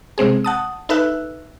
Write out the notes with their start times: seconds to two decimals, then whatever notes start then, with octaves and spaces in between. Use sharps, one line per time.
0.18 C3 G#3 C4 G#4
0.44 F#5 A5 D#6
0.89 D#4 A4 B4 E5 E6 F#6